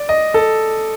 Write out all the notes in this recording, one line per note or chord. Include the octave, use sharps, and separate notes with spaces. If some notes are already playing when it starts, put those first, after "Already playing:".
Already playing: D5
D#5
A4